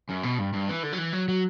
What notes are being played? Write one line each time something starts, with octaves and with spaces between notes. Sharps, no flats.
F#2
B2
G2
G2
E3
D3
F#3
E3
F#3
F#3